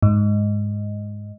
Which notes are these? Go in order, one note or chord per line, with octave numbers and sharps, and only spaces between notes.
G#2